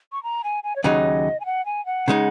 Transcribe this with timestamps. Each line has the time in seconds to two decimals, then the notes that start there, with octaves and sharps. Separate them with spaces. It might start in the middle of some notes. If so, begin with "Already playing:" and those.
0.12 C#6
0.23 A#5
0.44 G#5
0.63 G#5
0.76 C#5
0.84 D#2 C#3 F#3 D#4 D#5
1.40 G#5
1.46 F#5
1.66 G#5
1.86 F#5
2.08 C#3 G#3 D#4